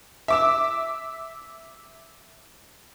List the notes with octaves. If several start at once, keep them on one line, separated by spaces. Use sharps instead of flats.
E5 D6 E6